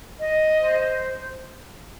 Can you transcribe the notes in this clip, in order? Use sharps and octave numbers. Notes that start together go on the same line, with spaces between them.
D#5
C5